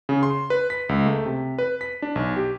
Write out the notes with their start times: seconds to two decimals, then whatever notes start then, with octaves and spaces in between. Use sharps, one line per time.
0.09 C#3
0.23 C6
0.50 B4
0.70 B6
0.89 C#2
1.06 A3
1.26 C3
1.58 B4
1.81 B6
2.02 D4
2.16 B1
2.36 G4